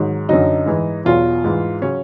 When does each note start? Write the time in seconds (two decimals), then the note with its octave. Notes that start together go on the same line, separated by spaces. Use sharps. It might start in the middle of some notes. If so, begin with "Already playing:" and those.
Already playing: G#2 D#3 F#3
0.29 F#2 D3 F#3 D#4
0.66 G#2 E3
1.05 E2 B2 F#3 F4
1.44 G#2 E3
1.82 C#3 F#3 C#4